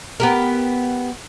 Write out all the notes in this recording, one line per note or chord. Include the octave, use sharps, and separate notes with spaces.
B3 G4 A#4